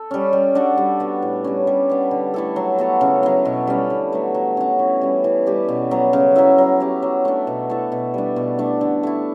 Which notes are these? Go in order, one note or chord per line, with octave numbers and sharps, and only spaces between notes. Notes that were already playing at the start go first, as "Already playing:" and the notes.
Already playing: A4
G3 C#4
G3
D4 F#4 A4
G3
B3 F#4
A2
G3 C#4
G3
B3 D4
D3
A3 E4 A4
F#3
B3 F#4 A4
C#3
F#3 B3
B2
G3 C#4
D3
F#3 A3
F#3
C#4 F#4
E3
G3 C#4
E3
G3 C#4 G4
B2
F#3 B3
C#3
F#3 B3 E4
F#3
C#4 G4
F#3
A3 D4
B2
A3 E4 A4
B2
G3 D4
B2
A3 D4
D3
A3 E4